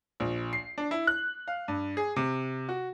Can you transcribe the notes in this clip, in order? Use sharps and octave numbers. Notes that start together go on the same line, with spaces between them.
A#1
C7
D4
E4
F#6
F5
G2
G#4
C3
F#4